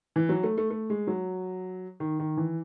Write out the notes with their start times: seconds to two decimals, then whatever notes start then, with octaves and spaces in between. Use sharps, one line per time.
0.16 E3
0.29 F#3
0.43 A3
0.57 A3
0.70 A3
0.90 G#3
1.07 F#3
2.00 D#3
2.20 D#3
2.37 E3